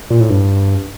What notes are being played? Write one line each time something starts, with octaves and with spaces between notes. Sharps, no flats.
A#2
A2
G2